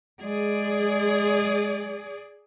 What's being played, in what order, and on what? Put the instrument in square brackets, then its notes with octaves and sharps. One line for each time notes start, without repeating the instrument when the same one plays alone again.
[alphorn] G#3 [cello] G#4 D5